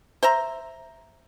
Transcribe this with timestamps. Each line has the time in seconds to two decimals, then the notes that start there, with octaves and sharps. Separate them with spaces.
0.23 C5 E5 A#5